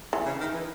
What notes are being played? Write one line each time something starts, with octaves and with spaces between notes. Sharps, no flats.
E3
C#3
D#3
E3